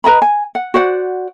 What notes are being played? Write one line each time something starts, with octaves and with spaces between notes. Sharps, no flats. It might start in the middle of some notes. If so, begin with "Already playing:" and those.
B4 D#5 A#5 B5
G#5
F#5
F#4 C5 D5 F#5